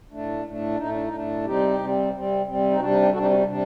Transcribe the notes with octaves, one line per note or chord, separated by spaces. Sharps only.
A2 A3 D4
A2 A3 D4
A2 A3 D4 D#4
D4
D#4
A2 A3 D4
C3 G3 C4 D#4 G4
C3 G3 C4
C3 G3 C4
C3 G3 C4
D#4
C3 G3 D4 F#4
D#4
D#4 G4
C3 G3 D4 F#4 A4
D#4 G4
D4 F#4
D#4
C3 G3 D4